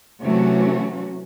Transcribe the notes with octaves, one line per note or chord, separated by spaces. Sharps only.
C3 E3 F#3 A3 C#4 F#4